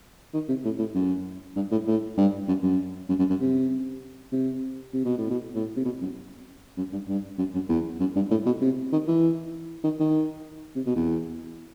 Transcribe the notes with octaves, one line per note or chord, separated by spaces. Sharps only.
D#3
C3
A2
A2
F#2
G2
A2
A2
G2
F#2
F#2
F#2
F#2
F#2
C3
C3
C3
B2
A2
B2
A2
C3
B2
F#2
F#2
G2
G2
F#2
F#2
E2
F#2
G2
A2
B2
C3
D#3
E3
D#3
D#3
C3
B2
E2